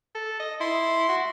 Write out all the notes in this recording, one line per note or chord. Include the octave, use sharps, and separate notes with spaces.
A4
D#5
E4 C6
F#4